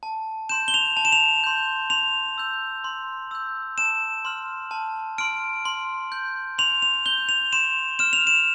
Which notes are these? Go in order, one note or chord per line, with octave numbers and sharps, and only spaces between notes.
A5
C6 G6 E7
G7
F7
A5 F7
E7
F7
C6 G6
C6 F7
E6 G6
C6
E6 G6
A5 E7
C6 F6
A5
C6 F6 D7
C6
G6
C6 F7
F7
G6 G7
F7
C6 E7
F6 E7
F7
E7